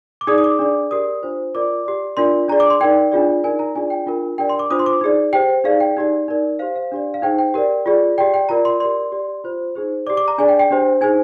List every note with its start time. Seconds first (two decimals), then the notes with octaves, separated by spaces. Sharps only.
0.21 D6
0.27 D#4 G#4 D5 D#6
0.38 D#6
0.44 D6
0.59 D4 G#4 D5
0.91 G4 A#4 D5 D#6
1.22 D4 F4 C5
1.55 F4 A#4 D5 D6
1.85 G4 D5
2.17 D4 F4 A#4 D5 C6
2.48 D4 G#4 D5 A#5
2.60 D6
2.70 C6
2.81 D#4 A#4 D5 G5
3.12 D4 F4 G#4 D5
3.43 D#4 A#4 D5 G#5
3.59 A#5
3.75 D4 F4 G#4 D5 G#5
3.90 G5
4.06 D4 F4 A#4
4.38 D4 G4 A#4 D5 G5
4.49 C6
4.59 D6
4.70 D4 F4 C5 D#6
4.79 C6
4.86 D6
5.01 D#4 G#4 D5
5.33 G4 C5 G5
5.64 D#4 G#4 D5 F5
5.80 G5
5.97 D#4 G4 D5
6.28 D#4 A#4 D5
6.59 G4 C5 F5
6.76 F5
6.92 D4 G4 D5
7.14 F5
7.22 D#4 G#4 C5 G5
7.39 G5
7.54 G4 A#4 D5
7.86 F4 G#4 D5
8.18 G4 D5 G5
8.34 G5
8.49 F4 A#4 D5 A#5
8.65 C6
8.80 G4 A#4 D5 C6
9.12 G4 D5
9.44 F4 C5
9.75 D#4 G#4 C5
10.07 G4 D5 D6
10.17 D6
10.28 A#5
10.38 D4 G#4 D5 G#5
10.49 G5
10.59 G5
10.70 D4 G4 C5
11.01 D#4 G#4 C5 G#5